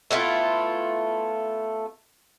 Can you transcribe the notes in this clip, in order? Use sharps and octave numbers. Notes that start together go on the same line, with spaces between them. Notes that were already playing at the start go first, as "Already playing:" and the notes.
A3 B3 E4 F4